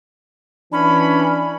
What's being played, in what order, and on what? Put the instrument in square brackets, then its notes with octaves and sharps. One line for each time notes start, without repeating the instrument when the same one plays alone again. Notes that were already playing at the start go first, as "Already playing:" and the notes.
[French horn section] E3 [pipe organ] C#4 [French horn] D4 [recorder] B5